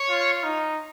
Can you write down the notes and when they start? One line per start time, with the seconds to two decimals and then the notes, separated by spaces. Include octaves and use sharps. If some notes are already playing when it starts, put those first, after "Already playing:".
Already playing: C#5
0.10 F4
0.43 D#4